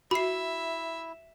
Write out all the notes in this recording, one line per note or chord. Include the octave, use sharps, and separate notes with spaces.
E4 F#4 E5 B5 C7